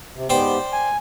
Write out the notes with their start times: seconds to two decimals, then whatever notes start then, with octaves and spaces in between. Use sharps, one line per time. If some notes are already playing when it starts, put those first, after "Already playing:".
0.16 C3
0.30 G#2 B3 G4 C5 D5 G5
0.73 G#5